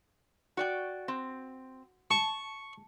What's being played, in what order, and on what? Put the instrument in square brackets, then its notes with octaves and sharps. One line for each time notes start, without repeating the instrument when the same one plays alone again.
[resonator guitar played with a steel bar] F#4 D5 G5
C4
[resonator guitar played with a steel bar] A5 [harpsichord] C#6